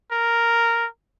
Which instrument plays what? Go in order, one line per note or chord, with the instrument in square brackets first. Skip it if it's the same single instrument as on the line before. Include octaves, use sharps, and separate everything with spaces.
[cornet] A#4